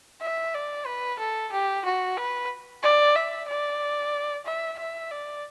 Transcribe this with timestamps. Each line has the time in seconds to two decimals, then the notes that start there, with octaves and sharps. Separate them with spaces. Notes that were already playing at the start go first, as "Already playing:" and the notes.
0.21 E5
0.54 D5
0.86 B4
1.19 A4
1.52 G4
1.85 F#4
2.17 B4
2.83 D5
3.15 E5
3.48 D5
4.46 E5
4.78 E5
5.11 D5